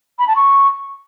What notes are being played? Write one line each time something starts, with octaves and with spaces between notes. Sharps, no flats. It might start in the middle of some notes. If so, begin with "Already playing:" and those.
B5
A5
C#6